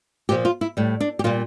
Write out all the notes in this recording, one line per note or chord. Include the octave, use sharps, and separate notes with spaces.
A#2 F3 G4
F4
E4
A2 G3
D4
G4
A#2 G3 F4